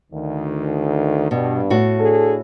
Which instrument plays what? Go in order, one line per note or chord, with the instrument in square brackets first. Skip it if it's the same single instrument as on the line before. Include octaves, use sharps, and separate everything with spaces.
[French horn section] D2 D#3
[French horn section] G2 [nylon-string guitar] B2
[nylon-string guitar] A2 F#4
[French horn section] D4 G#4 A4